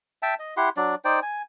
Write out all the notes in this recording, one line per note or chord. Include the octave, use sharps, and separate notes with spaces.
E5 G5 A5
D#5
E4 G4 F#5 C6
F#3 D4 D5
D#4 C5 D5 G5
G#5